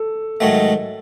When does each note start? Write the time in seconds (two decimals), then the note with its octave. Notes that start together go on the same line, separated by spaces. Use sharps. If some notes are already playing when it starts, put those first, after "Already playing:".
Already playing: A4
0.41 G#2 D#3 F#3 A3